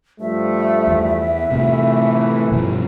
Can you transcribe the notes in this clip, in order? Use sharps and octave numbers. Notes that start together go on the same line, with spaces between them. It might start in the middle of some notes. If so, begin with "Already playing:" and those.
G2 F3 A3 E5
E2
A2 C3 E3 A3
G2 B2 F3